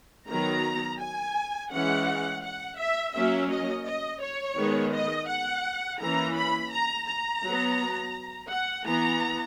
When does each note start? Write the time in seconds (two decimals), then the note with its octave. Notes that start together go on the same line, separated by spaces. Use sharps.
0.28 D#3 F#3 B3 A#5
1.00 G#5
1.71 E3 G#3 C#4 F#5
2.42 F#5
2.79 E5
3.13 F#3 A#3 C#4 E5
3.50 D#5
3.85 D#5
4.21 C#5
4.57 D#3 G#3 B3
4.93 D#5
5.28 F#5
6.00 E3 A#3 C#4 A#5
6.35 B5
6.71 A#5
7.07 A#5
7.43 F#3 B3
8.49 F#5
8.85 E3 B3 A#5